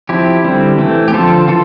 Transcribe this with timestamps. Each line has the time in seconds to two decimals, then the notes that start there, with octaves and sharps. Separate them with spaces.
0.09 F3 C4 E4 G4
0.44 D3 G3 C4
0.78 E3 A3 C4
1.08 G4
1.13 D3 F3 C4 F4 A4
1.48 E3 F4 A4